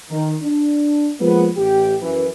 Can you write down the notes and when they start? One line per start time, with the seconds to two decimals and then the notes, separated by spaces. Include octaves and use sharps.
0.11 D#3
0.42 D4
1.21 F3 G#3 A#3 B3
1.57 A1 G4
2.02 F#2 E3